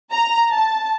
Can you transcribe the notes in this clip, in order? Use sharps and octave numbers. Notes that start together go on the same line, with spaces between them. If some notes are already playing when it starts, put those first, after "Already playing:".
A#5
A5